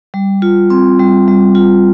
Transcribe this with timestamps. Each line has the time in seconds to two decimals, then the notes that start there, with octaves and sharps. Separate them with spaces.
0.14 G3
0.42 F4
0.70 C4
0.99 G3
1.28 G3
1.55 F4